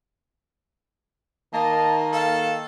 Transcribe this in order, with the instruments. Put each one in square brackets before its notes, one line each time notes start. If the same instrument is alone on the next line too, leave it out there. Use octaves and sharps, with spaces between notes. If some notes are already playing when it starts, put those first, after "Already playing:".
[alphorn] D#3 [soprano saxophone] A#3 [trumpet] D#5 [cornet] A5
[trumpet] A4 [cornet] F5